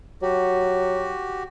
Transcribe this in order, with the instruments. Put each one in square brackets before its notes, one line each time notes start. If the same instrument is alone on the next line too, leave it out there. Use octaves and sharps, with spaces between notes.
[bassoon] F#3 [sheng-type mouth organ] F#4 G4